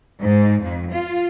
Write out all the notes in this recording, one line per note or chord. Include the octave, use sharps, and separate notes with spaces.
G#2
F2
F4